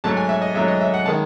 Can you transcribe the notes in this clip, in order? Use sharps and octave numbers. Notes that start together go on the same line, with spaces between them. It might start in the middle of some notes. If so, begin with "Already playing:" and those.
G#2 F#3 A3 A5
G#5
E5
D#5
G#2 F#3 A3 E5
D#5
E5
F#5
D#3 G#3 A5